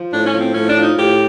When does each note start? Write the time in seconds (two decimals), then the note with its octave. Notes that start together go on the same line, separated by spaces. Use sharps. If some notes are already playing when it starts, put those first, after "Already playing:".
Already playing: F3
0.12 A2 D4
0.27 C#4
0.34 F3
0.41 C4
0.54 A2 C#4
0.69 D4
0.76 F3
0.83 D#4
0.97 A2 G4